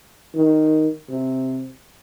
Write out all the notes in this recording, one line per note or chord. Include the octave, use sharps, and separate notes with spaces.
D#3
C3